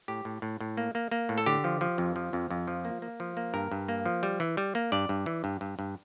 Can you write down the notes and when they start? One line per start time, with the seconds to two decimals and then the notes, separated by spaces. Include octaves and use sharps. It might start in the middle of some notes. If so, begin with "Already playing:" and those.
0.08 A2 G4
0.25 A2
0.42 A2
0.60 A2
0.77 A#3
0.95 A#3
1.11 A#3
1.29 A2
1.38 A4
1.46 D3 G4
1.64 F3
1.81 F3
1.98 F2
2.16 F3
2.33 F2
2.50 F2
2.67 F3
2.85 A#3
3.02 A#3
3.20 F3
3.37 A#3
3.54 G2 A#4
3.72 G2
3.88 A#3
4.06 F3
4.23 G3
4.40 E3
4.57 G3
4.75 A#3
4.92 G2 D5
5.09 G2
5.26 E3
5.44 G2
5.61 G2
5.79 G2